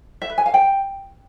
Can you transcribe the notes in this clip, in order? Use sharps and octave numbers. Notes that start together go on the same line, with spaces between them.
E5
B4
G#5
F5
G5